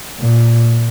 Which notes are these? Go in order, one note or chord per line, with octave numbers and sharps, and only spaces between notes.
A#2